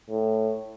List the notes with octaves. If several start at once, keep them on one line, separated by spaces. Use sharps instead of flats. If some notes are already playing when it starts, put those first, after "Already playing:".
A2